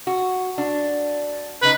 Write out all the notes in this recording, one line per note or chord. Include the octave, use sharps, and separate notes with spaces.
F#4
D4 F#4
C#3 D#4 B4